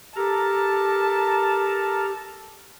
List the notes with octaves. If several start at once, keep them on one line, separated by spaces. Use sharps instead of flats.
G4 A4 A#4 A5 A#5